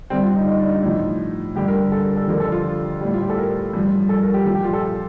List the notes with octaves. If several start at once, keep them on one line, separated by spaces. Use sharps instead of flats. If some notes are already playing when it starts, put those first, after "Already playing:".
G2 D3 G3 C4
F4
D#4
D#4
D4
D#4
A2 F3
G2 D3 G3 G4
A#4
A4
A#4
A4
F2 D3 F3 A#4
A4
F4
A2 G3
F4
G4
A4
A#4
G2 F3
A4
A#4
G4
A#2 F3 F4
G4
F4
A4